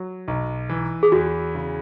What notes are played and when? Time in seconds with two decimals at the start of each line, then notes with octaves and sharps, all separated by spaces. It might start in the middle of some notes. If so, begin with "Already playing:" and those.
Already playing: F#3
0.28 B1
0.69 E3
1.03 G#4
1.12 E2 F#4
1.55 C#3